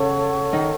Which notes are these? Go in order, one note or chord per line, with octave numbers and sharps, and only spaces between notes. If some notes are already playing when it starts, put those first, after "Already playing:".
Already playing: C#3 A4 C#5 F#5 C#6
D#3 D#4